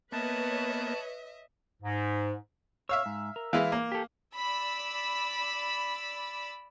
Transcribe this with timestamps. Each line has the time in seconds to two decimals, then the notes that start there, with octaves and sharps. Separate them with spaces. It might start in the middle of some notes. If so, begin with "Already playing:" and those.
0.12 A#3 B3 B4 C#5 D#5 E5 A5
1.83 G#2
2.89 C#5 E5 F5 E6
3.06 G#2
3.36 A#4
3.53 E3 G#3 E4 F5
3.72 A#3
3.92 G4 A4
4.34 D5 B5 E6